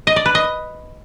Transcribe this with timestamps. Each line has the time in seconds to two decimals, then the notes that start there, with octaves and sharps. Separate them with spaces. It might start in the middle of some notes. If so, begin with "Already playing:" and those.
0.07 D#5
0.16 D5
0.26 B4
0.35 D#5